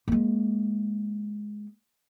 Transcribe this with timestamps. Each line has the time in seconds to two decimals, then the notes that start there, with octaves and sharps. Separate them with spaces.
0.08 G#3 A#3